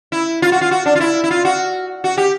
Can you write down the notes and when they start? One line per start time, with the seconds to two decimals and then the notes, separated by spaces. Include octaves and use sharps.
0.12 E4
0.42 F4
0.52 F#4
0.61 F4
0.71 F#4
0.86 D4
0.95 F4
1.00 E4
1.24 E4
1.31 F4
1.45 F#4
2.04 F#4
2.17 G4